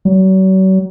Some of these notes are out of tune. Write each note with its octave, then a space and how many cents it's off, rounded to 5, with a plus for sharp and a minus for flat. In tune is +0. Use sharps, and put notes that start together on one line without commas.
F#3 +40